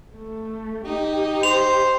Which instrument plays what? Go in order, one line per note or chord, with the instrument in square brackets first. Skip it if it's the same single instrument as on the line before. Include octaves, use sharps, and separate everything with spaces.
[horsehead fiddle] A3
[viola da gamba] D#4 [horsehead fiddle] G4
[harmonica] C5 [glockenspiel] F7